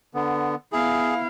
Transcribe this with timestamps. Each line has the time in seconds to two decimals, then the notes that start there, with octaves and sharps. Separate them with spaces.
0.14 D3 B3
0.72 B3 E4 G#4 F5